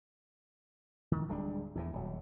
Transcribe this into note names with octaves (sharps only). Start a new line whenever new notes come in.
D#3
D1 G3 G#3 D4
E2 A2 E3
D#1 F#3